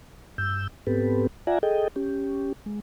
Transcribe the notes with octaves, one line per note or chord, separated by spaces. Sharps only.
G2 E6 G6
G#2 B3 C4 G4 A4 B4
F4 D5 E5 F#5 G#5 A#5
G#4 A4 D#5 G5
C#4 G4
G#3